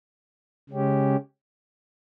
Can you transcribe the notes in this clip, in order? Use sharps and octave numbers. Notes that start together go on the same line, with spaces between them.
C#3 G#3 C#4 G4